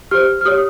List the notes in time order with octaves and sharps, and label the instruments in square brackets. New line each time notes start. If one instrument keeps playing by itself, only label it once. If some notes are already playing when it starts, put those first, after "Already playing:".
[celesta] G4 C5 F6
F6
G4 C#5 D#6